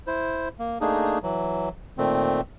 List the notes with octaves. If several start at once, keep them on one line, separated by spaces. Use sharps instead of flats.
E4 C5
A#3
A3 A#3 D4 D#4 G#4
E3 F#3
A#2 D#3 A3 C4